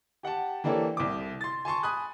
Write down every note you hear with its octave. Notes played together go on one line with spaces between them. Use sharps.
G4 F#5 G5 A5
E3 A#3 D4 G4 A4 C#5
C2 D6
C6 A6
G#5 A5 C6 C#6
G#5 B5 D#6 F#6